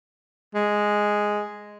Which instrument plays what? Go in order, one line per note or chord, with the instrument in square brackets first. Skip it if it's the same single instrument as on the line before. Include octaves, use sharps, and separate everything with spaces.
[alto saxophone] G#3